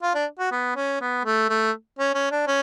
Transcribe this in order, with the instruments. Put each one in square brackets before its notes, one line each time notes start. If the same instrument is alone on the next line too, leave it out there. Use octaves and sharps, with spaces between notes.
[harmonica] F4
D4
F#4
B3
C#4
B3
A3
A3
C#4
C#4
D4
C#4